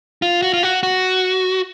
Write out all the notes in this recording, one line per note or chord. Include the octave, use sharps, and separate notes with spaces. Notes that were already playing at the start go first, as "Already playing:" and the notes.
F4
F#4
F4
F#4
F#4